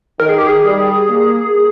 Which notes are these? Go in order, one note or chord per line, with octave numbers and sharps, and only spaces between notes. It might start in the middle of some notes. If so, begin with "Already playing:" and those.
D#3 A#4
G#4
G4
G#4
G3
A#3